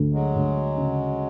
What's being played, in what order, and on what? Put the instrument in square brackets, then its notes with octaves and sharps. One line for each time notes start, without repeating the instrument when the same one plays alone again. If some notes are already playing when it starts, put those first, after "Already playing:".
Already playing: [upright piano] D2
[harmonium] F#3 G#3
[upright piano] D2
C#3